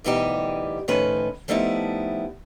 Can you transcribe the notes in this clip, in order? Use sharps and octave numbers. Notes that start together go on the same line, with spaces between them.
D2 B2 E3 G3 D#4 G4
A2 D#3 F3 C#4 D#4 B4
F3 G3 A3 B3 D#4 E4